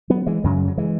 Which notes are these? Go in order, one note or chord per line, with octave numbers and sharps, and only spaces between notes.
F#3 B3
E3 G#3
F#2 C#3 F#3
F#3
E3 G#3